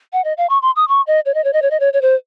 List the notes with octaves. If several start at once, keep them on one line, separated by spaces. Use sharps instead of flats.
F#5
D#5
F5
C#6
C6
D#6
C#6
D#5
C#5
D#5
C#5
D#5
C#5
D#5
C#5
C#5
C5